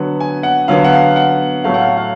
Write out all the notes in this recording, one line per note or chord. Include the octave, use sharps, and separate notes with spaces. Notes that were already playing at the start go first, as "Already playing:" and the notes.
Already playing: D3 F#3 B3 F#5
G#5
F#5
D3 F#3 B3 F5
F#5
F5
F#5
A2 F#3 A3 F5
F#5
F5
F5